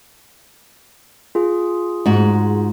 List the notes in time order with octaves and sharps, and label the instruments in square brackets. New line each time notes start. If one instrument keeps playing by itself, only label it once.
[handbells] F4 G#4
[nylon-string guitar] G#2 F#4